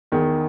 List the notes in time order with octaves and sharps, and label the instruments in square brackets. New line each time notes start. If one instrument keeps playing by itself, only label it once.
[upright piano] E2 D#3